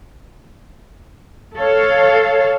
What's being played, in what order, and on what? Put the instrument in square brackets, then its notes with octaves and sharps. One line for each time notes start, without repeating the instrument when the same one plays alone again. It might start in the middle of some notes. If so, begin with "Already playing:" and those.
[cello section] A4 C#5 F5